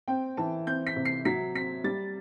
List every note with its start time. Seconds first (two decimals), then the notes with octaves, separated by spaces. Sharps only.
0.08 C4 G5
0.37 E3 A5
0.67 C4 G6
0.87 B6
0.96 C3
1.05 C7
1.25 F#3 B6
1.55 C4 B6
1.84 G3 A6